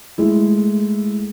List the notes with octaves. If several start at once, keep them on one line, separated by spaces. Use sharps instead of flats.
G#3 A3 E4